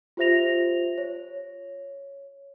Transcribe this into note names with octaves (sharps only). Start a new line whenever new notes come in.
F4 G4 C5 E5 A#6 F7
C#5